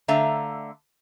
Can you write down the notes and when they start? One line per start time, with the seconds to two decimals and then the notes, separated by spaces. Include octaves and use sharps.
0.08 D3 A3 E5 F5 A#5